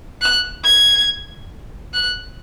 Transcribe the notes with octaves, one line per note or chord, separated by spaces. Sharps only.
F#6
G#6
F#6